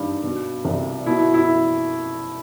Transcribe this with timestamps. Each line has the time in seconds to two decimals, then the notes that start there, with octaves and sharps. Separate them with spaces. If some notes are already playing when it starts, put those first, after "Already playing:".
Already playing: G2 D#3
0.23 B2
0.65 C2
1.06 B2 E4
1.34 E4